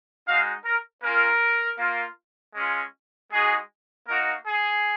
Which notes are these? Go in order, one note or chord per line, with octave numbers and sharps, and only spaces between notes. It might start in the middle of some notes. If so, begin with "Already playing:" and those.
G#3 D#4 F#4 F5
A#4
A#3 C#4 F4 A#4
A#3 F4
G#3 C#4 F4
G#3 D#4 F#4 G#4
A#3 D#4 F#4 A#4
G#4